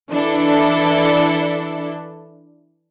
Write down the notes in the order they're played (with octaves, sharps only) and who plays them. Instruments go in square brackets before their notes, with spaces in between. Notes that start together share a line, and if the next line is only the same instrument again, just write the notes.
[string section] E3 D4 E4 A4